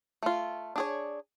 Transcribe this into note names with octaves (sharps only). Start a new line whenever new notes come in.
A3 F4
D4 G#4 C#5